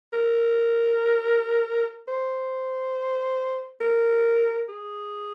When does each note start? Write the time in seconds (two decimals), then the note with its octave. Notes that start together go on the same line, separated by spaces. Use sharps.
0.13 A#4
2.08 C5
3.81 A#4
4.68 G#4